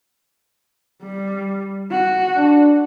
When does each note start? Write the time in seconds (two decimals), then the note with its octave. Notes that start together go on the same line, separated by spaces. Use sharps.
1.02 G3
1.91 F#4
2.37 D4